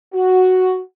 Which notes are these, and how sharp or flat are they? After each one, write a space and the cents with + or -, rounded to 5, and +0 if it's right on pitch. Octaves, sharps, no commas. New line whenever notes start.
F#4 +0